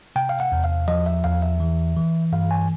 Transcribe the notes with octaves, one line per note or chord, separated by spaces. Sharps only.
C3 G5
F5
F#5
E2
F5
F3 D#5
E5
E2 F5
E5
E3
E3
G2 F5
G#5